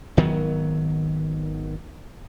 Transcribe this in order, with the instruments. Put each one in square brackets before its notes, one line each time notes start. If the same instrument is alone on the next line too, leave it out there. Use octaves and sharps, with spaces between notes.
[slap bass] G#1 D#3 F#3 B3